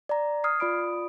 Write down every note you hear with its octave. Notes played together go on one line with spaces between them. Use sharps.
D5 A#5
D#6 F6 G#6 C7
F4 D5 B5 D#6 D7